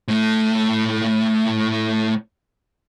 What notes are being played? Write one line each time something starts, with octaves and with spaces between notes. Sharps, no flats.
A2 A3